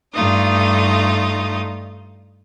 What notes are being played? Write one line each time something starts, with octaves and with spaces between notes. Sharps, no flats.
G2 A3 D#4 F4 D#6